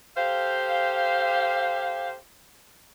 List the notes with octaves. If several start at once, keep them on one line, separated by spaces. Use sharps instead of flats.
G4 A4 C5 F5